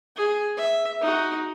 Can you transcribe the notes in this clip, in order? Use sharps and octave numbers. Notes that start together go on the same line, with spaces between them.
G#4
E5
D#4 F#4